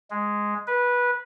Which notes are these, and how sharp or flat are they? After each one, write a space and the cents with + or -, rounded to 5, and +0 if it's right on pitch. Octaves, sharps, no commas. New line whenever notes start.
G#3 +0
B4 -15